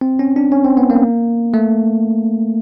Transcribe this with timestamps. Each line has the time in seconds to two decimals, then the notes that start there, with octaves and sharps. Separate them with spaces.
0.01 C4
0.19 C#4
0.36 D4
0.52 C#4
0.65 C4
0.77 B3
0.90 A#3
1.54 A3